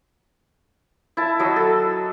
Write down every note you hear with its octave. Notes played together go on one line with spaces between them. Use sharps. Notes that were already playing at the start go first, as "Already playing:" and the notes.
E4 A5
F#3 D#5
A4